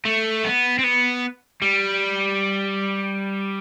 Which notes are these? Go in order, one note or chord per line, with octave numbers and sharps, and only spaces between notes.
A3
B3
C4
B3
G3